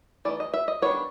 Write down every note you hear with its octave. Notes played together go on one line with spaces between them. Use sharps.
E3 A3 D#4 D5
D#5
E5
D#5
D#3 G3 B3 D4 C#5